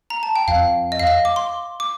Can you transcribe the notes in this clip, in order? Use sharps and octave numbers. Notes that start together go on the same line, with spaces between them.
A#5
A5
G5
F2 F5
D#5
F5
D#5
D6
C6
D6